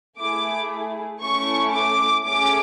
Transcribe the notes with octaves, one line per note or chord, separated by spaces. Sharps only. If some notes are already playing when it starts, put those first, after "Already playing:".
A3 E4 G#4 D6
A3 C#4 E4 A4 C#6
D6
A3 C#4 G#4 D6